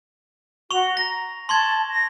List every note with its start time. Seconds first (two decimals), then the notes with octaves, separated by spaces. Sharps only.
0.71 F#4 C#6 F7
0.97 A#5 A#6
1.49 A5 C6 C#6 G#6
1.90 A#6